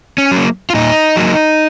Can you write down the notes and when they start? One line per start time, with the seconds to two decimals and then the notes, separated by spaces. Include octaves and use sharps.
0.18 C#4
0.31 F#3
0.37 A#3
0.70 F4
0.74 A#2 D#4
1.17 F#3 A#3